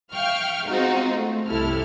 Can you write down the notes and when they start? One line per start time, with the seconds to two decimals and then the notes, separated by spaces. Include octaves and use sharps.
0.13 E5 F5 G5 C#6 F6
0.68 G#3 C4 D#4 F4 F#4
1.09 A3 C4
1.47 C2 F#2 C3 E4 A4 F6